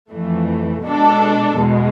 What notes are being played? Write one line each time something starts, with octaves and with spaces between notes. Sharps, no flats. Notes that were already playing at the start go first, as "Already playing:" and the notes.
F2 E3 A3
B2 G#3 D4 A4
E2 B2 G#3